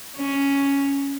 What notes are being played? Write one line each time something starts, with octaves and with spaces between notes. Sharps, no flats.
C#4